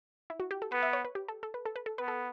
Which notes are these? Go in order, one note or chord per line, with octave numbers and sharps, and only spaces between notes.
E4
F#4
G4
A4
B3 B4
E5
C#5
B4
G4
A4
A4
B4
A4
B4
A4
B3 B4
A4